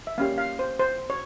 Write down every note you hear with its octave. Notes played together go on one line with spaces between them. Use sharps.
E5
A#3 C#4 G4 F5
F5
C5
C5
C#5